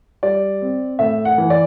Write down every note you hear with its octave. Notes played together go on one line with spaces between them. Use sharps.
G3 D5
C4
A2 E5
F#5
E3
D5